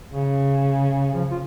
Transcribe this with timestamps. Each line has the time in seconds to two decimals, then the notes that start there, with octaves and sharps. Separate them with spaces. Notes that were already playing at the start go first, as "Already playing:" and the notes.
0.13 C#3
1.14 F3
1.31 F4